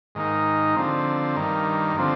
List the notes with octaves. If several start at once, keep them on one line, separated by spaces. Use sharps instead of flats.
G#2 D#3 A#3 D#4
D3 F3 C4
G2 D#3 A#3
D3 F3 C4